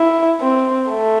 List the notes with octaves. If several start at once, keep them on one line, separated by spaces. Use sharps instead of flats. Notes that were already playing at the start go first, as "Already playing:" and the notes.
Already playing: E4
C4
A3